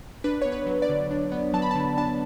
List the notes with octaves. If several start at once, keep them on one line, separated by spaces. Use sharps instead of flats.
D4 B4
B3 C#5
B4
F#3
D5
D3
D4
B3
F#3 A5
B5
D3 A5
D4 A5